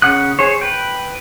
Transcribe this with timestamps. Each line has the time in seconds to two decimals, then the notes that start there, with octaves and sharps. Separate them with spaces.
0.02 C#3 F#5 D#6 F#6
0.39 G#4 C5 C#5
0.61 B4 G5